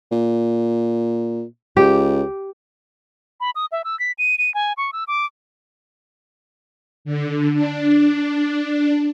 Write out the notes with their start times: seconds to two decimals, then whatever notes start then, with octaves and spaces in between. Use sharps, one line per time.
0.12 A#2
1.77 C#2 G4
3.41 B5
3.55 D#6
3.72 E5
3.84 E6
4.00 B6
4.18 D#7
4.38 D#7
4.54 G#5
4.77 C#6
4.93 E6
5.08 D6
7.05 D3
7.53 D4